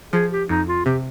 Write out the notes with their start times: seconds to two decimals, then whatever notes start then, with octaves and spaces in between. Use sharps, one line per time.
0.13 F3 G#4
0.32 G4
0.49 F2 D#4
0.67 F4
0.85 C3 G4